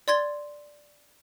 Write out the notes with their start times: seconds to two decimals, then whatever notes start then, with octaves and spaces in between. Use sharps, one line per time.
0.08 D5 C6 G#6 A6 G7